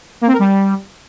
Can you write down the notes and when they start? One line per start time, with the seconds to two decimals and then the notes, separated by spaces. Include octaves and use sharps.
0.21 A#3
0.27 C4
0.33 A#4
0.39 G3